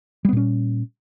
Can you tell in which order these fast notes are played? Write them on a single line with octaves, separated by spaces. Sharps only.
G3 B3 A#2 C#4